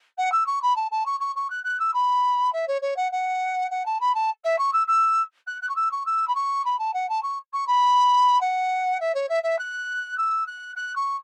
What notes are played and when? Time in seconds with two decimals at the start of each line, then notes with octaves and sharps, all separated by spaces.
0.18 F#5
0.32 E6
0.46 C#6
0.62 B5
0.76 A5
0.91 A5
1.06 C#6
1.20 C#6
1.35 C#6
1.50 F#6
1.64 F#6
1.79 E6
1.93 B5
2.52 E5
2.67 C#5
2.81 C#5
2.96 F#5
3.12 F#5
3.71 F#5
3.85 A5
4.00 B5
4.14 A5
4.44 E5
4.58 C#6
4.73 E6
4.87 E6
5.47 F#6
5.62 F#6
5.69 C#6
5.76 E6
5.91 C#6
6.06 E6
6.27 B5
6.35 C#6
6.65 B5
6.79 A5
6.93 F#5
7.09 A5
7.22 C#6
7.53 C#6
7.67 B5
8.41 F#5
9.00 E5
9.14 C#5
9.29 E5
9.43 E5
9.58 F#6
10.17 E6
10.46 F#6
10.76 F#6
10.95 C#6